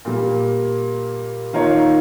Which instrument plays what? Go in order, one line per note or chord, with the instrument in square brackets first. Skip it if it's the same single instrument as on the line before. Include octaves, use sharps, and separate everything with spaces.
[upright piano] A#2 G3 A#3
D#3 A#3 F4 A#4 C#5